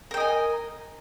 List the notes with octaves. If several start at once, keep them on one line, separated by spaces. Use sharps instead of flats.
A#4 D#5 G5 G#5